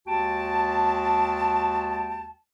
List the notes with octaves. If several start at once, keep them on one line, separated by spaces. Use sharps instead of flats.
D#2 G#3 F#4 G5 A5